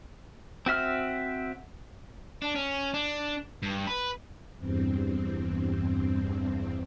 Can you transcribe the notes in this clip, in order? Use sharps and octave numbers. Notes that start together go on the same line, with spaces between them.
C4 F#4 E5 F6
D4
C#4
D4
G2
B4
E2 G2 C4